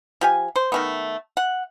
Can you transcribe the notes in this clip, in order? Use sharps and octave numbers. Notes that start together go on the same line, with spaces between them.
F3 G4 G#5
C5
D#3 A3 B3
F#5